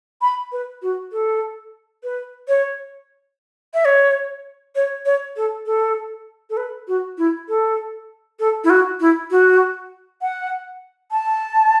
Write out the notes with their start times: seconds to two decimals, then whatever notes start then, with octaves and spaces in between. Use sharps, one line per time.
0.21 B5
0.52 B4
0.82 F#4
1.12 A4
2.03 B4
2.48 C#5
3.74 E5
3.85 C#5
4.75 C#5
5.05 C#5
5.36 A4
5.66 A4
6.50 A4
6.57 B4
6.88 F#4
7.18 E4
7.48 A4
8.39 A4
8.64 E4
8.70 F#4
9.00 E4
9.31 F#4
10.22 F#5
11.11 A5